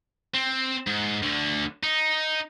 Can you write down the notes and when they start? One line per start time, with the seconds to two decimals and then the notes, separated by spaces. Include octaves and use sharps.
0.34 C4
0.87 G#2
1.23 D2 D3
1.83 D#4